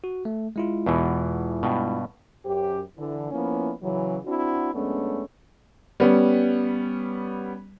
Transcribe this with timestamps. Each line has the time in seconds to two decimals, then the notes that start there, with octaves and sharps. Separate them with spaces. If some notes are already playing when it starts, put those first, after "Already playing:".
0.04 F#4
0.25 A3
0.56 G#3 E4 F4
0.86 E2 B2 E3
1.63 G2 B2
2.45 F#2 G4 C5
2.97 D3 E3
3.31 F3 A#3 B3 C#4 E4
3.83 C#3 E3 F#3
4.25 C4 D4 E4 F#4
4.74 F#2 G#3 A3 B3 C#4 D4
6.00 G3 B3 C#4